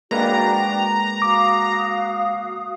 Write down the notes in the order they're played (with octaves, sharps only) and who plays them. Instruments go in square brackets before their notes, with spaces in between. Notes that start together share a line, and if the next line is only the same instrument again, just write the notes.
[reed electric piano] G#3 A#3 B4 [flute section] D4 F#4 G5 [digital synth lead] A#5
[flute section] F#4 F5 D#6 [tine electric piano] D6